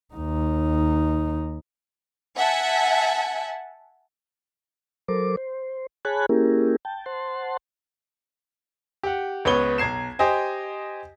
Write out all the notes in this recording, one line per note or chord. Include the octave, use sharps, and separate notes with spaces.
D#2 D#4
E5 F#5 G#5 A5
F#3 A4 A#4 C5 D6
C5
G#4 C#5 G#5 A5 B5 F#6
A#3 C#4 E4 G4 G#4 A#4
G5 A5
C5 F#5 A5 C6
G4 F#5
C#2 B3 C#5 B5 C#6 G7
B1 A#5 G#6 C7 E7
G4 C5 D#5 G#5